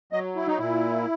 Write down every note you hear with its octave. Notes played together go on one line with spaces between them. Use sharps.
F#3 D#5
E4
D#4
A#2 E4